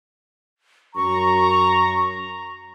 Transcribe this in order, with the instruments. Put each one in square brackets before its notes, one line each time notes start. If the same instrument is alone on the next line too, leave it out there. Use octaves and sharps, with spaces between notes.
[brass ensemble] F#2 A#5 [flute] C#6